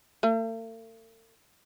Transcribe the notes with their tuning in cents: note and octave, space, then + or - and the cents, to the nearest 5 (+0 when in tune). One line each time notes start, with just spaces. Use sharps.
A3 +45